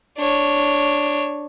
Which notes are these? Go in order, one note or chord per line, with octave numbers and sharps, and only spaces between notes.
D4 C#5